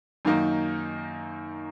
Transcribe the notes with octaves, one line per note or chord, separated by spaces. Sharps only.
F#2 D#3 A#3 D#4